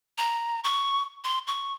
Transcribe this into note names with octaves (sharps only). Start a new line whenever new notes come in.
A#5
C#6
C6
C#6